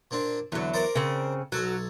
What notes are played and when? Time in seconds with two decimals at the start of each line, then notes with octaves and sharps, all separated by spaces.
0.11 A#2 C4 D4
0.52 E2 D3 F#3
0.74 A#4 C5 D5
0.95 C#3 C4
1.52 B1 F#3 A4 G#5